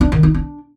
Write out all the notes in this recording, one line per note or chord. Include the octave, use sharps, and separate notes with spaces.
D4
D#3
D#4
D4